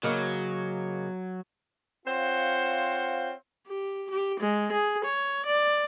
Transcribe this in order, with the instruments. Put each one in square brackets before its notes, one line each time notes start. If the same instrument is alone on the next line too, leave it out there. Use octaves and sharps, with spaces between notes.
[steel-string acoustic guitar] C#3 A#3 D#5 [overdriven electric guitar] F#3
[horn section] C4 F4 C5 C#5 F5 F#5
[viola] G4
G4
G#3
G#4
C#5
D5